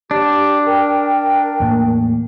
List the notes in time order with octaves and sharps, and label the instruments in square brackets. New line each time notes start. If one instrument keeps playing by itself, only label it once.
[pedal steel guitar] D4 [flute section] G4
[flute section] A#4 G5
[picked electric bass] E2 A2 A#3